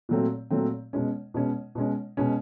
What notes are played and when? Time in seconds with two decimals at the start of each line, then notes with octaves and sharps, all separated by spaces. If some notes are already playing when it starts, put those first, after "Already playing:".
0.09 A#2 F#3 A3 C4
0.50 A#2 F#3 A3 C4
0.93 B2 G#3 C#4
1.34 B2 G#3 C#4
1.75 B2 G#3 C#4
2.17 B2 G#3 C#4